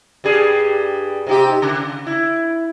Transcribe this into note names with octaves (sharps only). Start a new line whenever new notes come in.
G2 G3 G#4
C3 D#4 G4
C#3
E4